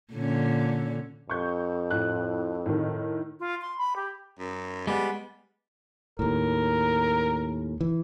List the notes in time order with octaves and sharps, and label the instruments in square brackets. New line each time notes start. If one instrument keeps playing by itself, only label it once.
[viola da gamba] A#2 D3 C#4
[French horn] F2 [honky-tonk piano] C#6 G6
[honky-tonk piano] A2 F#6
A2 D#3
[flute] F4
C6
B5
G4
[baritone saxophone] F#2
[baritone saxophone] G3 [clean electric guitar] G#3 B3
[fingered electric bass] D#2 A2 [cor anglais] A#4
[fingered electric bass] E3